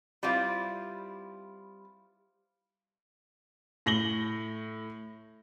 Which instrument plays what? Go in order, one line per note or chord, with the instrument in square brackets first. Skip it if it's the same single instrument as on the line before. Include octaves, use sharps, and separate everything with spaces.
[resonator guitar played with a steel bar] G3 C4 E4 F4 B4
[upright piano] A2 A#6 F#7 G7